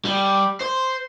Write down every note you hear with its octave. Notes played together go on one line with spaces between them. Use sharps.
G3
C5